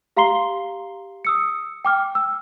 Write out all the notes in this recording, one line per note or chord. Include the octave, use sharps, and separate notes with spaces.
G4 F5 A#5 C6 C7 G7
D#6 E6 C#7
G5 D6 F6
E6